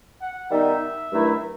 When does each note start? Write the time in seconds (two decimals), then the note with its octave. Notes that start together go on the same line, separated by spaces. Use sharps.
0.22 F#5
0.51 D#3 G3 B3 D#4 E5
1.12 G2 D#3 F#3 A3 E4